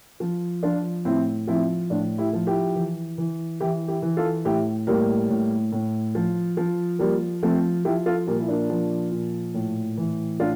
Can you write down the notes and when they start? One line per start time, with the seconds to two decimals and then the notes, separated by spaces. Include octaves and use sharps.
0.20 F3
0.63 F3 D4 F4
1.05 A2 C4 E4
1.48 F3 C4 E4
1.90 A2 D4 F4
2.18 E4 G4
2.33 F3
2.47 E4 G4
2.76 E3
3.18 E3
3.60 E3 E4 G4
3.88 E4 G4
4.02 E3
4.17 F4 A4
4.45 A2 E4 G4
4.87 A2 G3 A#3
5.29 A2
5.72 A2
6.15 F3
6.57 F3
6.99 F3 G3 A#3
7.43 F3 A3 C4
7.85 F3 E4 G4
8.06 F4 A4
8.27 A#2 G3 A#3
8.40 E4
8.48 A#3 D4
8.70 F3
9.12 A#2
9.54 A2
9.97 E3
10.40 A2 D4 F4